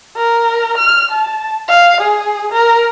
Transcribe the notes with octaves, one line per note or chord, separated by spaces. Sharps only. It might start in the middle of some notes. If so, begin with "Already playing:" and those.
A#4
F6
A5
F5
G#4
A#4